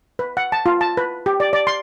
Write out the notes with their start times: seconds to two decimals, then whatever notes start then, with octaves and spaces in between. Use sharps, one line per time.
0.19 B4
0.37 F#5
0.52 A5
0.66 F4
0.81 A5
0.97 B4
1.26 G4
1.40 D5
1.53 D5
1.67 C6